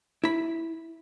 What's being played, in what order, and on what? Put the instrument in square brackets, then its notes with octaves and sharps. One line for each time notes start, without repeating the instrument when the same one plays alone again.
[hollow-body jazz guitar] E4 B5